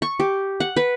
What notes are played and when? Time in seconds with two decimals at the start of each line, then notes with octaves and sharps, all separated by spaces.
0.02 C#6
0.20 G4
0.60 F#5
0.77 B4